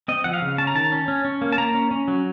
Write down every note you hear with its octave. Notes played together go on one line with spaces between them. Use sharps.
C4 D#5
F3 F#5
F5
C#3
C#4 A5
A#5
D#3 A5
C#4
C#4
C#4
A#3
A5
A#3 A#5
C#4
C#4
F#3